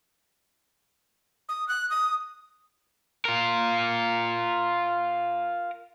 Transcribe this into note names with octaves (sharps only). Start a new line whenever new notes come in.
D#6
F#6
D#6
F4 A#4